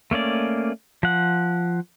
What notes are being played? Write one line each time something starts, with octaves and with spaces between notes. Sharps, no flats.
A3 A#3 C#4 D5
F3 F#5